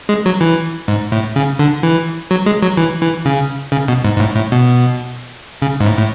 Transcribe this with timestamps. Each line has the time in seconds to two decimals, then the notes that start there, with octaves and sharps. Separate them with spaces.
0.09 G#3
0.26 F#3
0.41 E3
0.88 G#2
1.12 A2
1.36 C#3
1.59 D3
1.83 E3
2.31 F#3
2.46 G#3
2.62 F#3
2.77 E3
3.02 E3
3.25 C#3
3.72 C#3
3.88 B2
4.04 G#2
4.16 G#2
4.20 A2
4.36 A2
4.52 B2
5.62 C#3
5.81 G#2
5.86 A2
5.97 A2